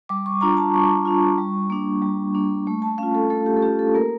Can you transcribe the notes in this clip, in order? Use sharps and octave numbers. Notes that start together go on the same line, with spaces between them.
G3 D6
C#6
D4 F4 A#5
A5
G3 C#6
D4 F4
G3
A#3 D4
G3
A#3 D4
A3
A5
C#4 F4 F5
A4
A3 A4
G4
A4
C#4 F4 G4
A4
A#3 A#4